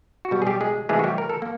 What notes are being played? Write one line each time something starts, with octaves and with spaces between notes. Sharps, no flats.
F#4
B2 G3 G4
G#4
G3 G4
G#3 G#4
C3 E3 G#3 A3 G#4
F#4
G3 G4
A#4
A4
A#3